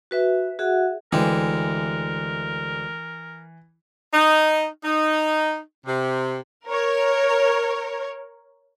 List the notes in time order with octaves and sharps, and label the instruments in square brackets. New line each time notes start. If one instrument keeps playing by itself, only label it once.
[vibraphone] F#4 B4 E5
F#4 G#4 E5 F#5
[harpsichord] D2 G#3 G4 [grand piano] E3 [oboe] A#4
[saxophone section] D#4
D#4
C3
[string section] A#4 C#5